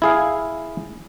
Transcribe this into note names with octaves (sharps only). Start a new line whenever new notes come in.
E4 G#4 F5